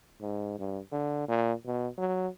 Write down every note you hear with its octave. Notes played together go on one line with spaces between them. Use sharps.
G#2
G2
D3
A#2
B2
F#3